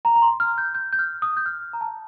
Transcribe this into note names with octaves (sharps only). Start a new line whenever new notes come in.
A#5
A#5
C6
F6
G6
G6
G6
F6
D#6
G6
F6
A#5
A5